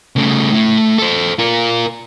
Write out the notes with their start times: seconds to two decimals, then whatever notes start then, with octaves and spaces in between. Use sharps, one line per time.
0.16 C#3 A3
0.53 A2 A3
0.98 A4 C5
1.39 F4 A#4